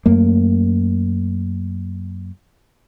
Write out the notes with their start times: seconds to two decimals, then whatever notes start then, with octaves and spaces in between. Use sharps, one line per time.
0.06 F#2 A3 A#3